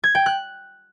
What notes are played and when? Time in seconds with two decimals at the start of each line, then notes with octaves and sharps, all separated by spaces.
0.04 G#6
0.15 G5
0.26 F#6